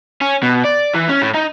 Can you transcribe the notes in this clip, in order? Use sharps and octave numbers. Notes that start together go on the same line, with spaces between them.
C#4
B2
D5
E3
C#4
A2
D#4